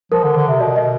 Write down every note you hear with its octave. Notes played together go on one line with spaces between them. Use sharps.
F3 A#4
D3
D3
C3
B2 D5
D#5